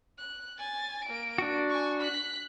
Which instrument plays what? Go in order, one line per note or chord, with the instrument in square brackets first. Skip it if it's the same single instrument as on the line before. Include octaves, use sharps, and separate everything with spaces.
[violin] F#6
G#5 A6
A#3 D7
[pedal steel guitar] D4 F#4
[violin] G#5 C#6
F#6 B6